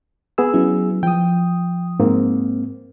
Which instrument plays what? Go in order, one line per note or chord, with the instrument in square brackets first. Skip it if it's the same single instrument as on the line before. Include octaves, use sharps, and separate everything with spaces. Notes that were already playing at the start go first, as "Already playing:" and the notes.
[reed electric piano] B3 G#4 E6
[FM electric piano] F#3 C#4 E4
[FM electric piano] F3 D#6 [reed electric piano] G5
[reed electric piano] G#2 A#3 C4